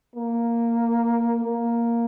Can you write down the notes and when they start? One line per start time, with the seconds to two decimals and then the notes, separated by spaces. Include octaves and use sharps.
0.16 A#3
1.44 A#3